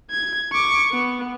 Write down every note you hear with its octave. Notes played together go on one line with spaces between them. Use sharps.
G#6
C#6 D6
B3